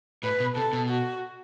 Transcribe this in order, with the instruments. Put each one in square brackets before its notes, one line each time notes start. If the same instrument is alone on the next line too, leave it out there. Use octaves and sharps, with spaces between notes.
[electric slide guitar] A2 [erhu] B4
[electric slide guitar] B2
[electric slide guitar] C3 [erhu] A4
[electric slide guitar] B2
[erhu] F#4